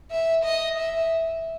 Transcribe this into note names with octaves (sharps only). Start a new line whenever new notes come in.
E5
D#5
E5